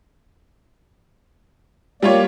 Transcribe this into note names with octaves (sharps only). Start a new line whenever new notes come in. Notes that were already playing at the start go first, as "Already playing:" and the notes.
G3 A#3 F4 C#5 D5